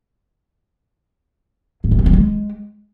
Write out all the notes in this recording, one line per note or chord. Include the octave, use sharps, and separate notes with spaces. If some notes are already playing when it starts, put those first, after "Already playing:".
G#2
F#2
C3
F3
G#3